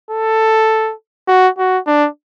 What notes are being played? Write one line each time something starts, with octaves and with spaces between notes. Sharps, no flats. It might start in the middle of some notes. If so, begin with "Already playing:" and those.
A4
F#4
F#4
D4